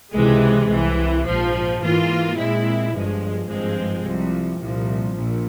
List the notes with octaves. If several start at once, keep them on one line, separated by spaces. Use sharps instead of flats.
C#2 C3 E3 G#3
C2 C3 E3
A#1 G#2 F3
G#2 E3 A#3 F4
A#2 G#3 C4 E4
G1 G2 F3 G#3
G#1 G2 F3 G#3 C4
C2 C3 F3
C2 A#2 F3
A#1 A#2